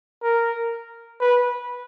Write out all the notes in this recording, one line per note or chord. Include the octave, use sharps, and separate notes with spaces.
A#4
B4